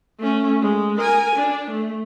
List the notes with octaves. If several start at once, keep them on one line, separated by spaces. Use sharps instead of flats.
A3 C#4
G#3
A#4 G#5
D4
A3